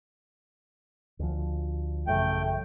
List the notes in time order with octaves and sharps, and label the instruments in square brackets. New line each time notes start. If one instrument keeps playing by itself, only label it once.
[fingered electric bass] D2 F3
[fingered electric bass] A1 F#2 C#3 [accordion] A3 G5